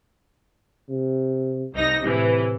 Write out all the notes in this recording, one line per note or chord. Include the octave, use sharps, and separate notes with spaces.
C3
C2 D#4 A#6
A2 C3 E3